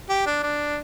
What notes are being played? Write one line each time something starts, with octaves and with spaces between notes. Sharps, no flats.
G4
D4
D4